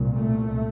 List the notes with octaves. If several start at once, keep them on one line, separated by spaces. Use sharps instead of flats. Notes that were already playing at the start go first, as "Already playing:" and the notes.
Already playing: C2 A#2
A3